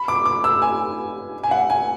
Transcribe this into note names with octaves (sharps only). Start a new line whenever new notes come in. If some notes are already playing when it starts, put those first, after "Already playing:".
Already playing: B5
D6
D6
E6
G#5
G#5
F#5
G#5